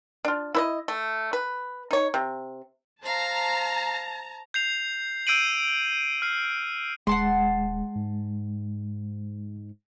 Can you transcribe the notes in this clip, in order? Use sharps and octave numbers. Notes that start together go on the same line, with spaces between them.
D4 F4
E4 B4 D#5
A3
B4
D#4 C#5
C3
C5 F5 A5 A#5
G6 C7 F7
E6 G6 C7 D7 D#7 F#7
F6 C7
D#1 G#3 F#5 A5 C6
G#2